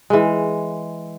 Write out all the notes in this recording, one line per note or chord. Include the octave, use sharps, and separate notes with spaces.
E3 G#3